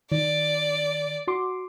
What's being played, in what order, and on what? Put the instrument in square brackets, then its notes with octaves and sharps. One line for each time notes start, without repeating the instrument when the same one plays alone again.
[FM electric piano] D#3 [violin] D5
[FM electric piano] F#4 C6 D6